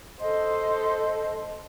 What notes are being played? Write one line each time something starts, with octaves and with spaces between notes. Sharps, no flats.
A4 C5 D#5